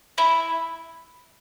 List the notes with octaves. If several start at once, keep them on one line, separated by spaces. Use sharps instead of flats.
E4